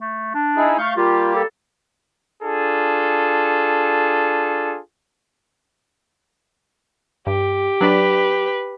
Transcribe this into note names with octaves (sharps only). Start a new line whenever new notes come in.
A3
D4
D#4 E4 G#4
A3 F5 C#6 G6
G3 A#3 F4 G4
A4
D4 F4 G#4 A4
G2 G4
F#3 D4 B4 D5